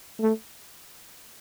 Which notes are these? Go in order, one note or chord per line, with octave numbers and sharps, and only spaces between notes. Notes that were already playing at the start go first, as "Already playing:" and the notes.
A3